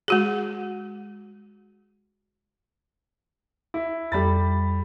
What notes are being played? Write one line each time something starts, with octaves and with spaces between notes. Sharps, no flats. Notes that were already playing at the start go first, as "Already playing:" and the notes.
G#3 F#4 G#4
E4
F2 G3 A4 B5 A6